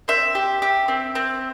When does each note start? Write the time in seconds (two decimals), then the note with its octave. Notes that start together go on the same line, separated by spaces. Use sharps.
0.08 C4 E5
0.35 G4
0.62 G4
0.88 C4
1.15 C4